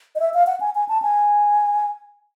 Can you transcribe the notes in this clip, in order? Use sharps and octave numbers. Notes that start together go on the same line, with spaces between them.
D#5
E5
F5
F#5
G#5
G#5
A5
G#5